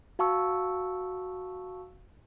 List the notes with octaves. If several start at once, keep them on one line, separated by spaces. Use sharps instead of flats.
F#4 F5 A5 C#6 E6